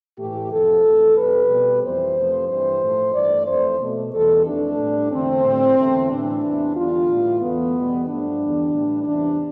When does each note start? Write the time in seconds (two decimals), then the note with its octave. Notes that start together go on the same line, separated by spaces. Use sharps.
0.17 A2 E3 A3 G4
0.51 F2 C3 F3 A4
0.83 F2 E3 A3
1.16 F2 C3 G3 B4
1.49 B2 G3
1.82 F2 E3 G3 C5
2.15 F2 C3 F3 A3
2.48 G2 E3 G3 C5
2.81 A2 F3 A3
3.13 G2 E3 A3 D5
3.46 F2 E3 A3 C5
3.79 B2 A3
4.12 E2 B2 G3 A4
4.44 F2 E3 A3 D4
4.78 A2 E3 G3
5.10 E2 D3 A3 C4
5.44 A2 G3
5.76 E2 D3 A3
6.09 A2 E3 G3 D4
6.41 E2 C3 E3
6.74 E2 D3 G3 F4
7.07 A2 E3 G3
7.40 E2 D3 A3 B3
7.74 E2 B2 G3
8.06 G2 F3 A3 D4
8.38 E2 D3 G3
8.71 A2 E3 G3
9.04 E2 C3 E3 G3 D4